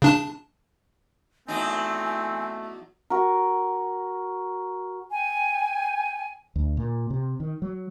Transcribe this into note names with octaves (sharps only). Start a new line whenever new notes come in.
C#3 D4 A5
E2 F#3 A3 C4 D#4 G#5
F#4 A#4
G5 G#5
D2
A#2
C3
D#3
F#3